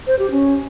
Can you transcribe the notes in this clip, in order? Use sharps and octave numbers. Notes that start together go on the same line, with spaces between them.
C5
G4
C#4